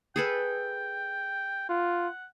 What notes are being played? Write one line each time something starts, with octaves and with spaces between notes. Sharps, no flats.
G#4 A4 B4 G5
F4 F#5